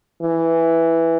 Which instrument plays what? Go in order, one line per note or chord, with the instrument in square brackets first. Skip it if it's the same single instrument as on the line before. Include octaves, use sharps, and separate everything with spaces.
[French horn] E3